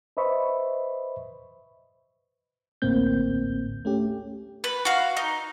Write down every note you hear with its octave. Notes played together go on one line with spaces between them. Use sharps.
B4 C5 D#5 E5 B5 C#6
A1 D2 A2 A#3 C4 G6
A3 C#4 G4
B4
F#4 F5
D#4